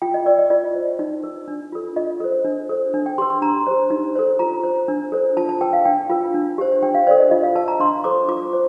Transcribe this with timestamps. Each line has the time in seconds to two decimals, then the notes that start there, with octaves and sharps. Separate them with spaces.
0.02 F4 G5
0.14 D#5
0.26 A#4 D5
0.39 D#5
0.50 F4 D5
0.75 C5
0.99 D#4
1.24 A#4
1.48 D4
1.72 F4 A4
1.96 F4 D#5
2.20 A4 C5
2.45 D4
2.69 A4 C5
2.94 D4
3.06 G5
3.18 G4 C6
3.22 A#4
3.30 C6
3.42 D4 A#5
3.67 G4 C5
3.90 D#4
4.16 A4 C5
4.39 F4 A#5
4.64 C5
4.88 D4
5.12 A4 C5
5.37 F4 A5
5.49 A5
5.61 A#4 G5
5.73 F5
5.85 D4 G5
6.10 F4 A#4
6.34 D4
6.58 G4 C5
6.83 D4 G5
6.95 F5
7.07 C5 D5
7.11 A4
7.19 D#5
7.31 F4 D#5
7.44 F5
7.55 A#4 A5
7.68 A#5
7.80 D4 C6
8.04 A4 C5 D6
8.29 F4 D6
8.53 C5